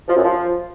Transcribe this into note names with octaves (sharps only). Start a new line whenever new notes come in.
F3
F#2
F3